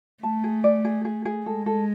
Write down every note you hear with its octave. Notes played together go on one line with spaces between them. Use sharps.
A3 A5
G#4
D5
G#4
G#4
G#4
G#3 A4
A4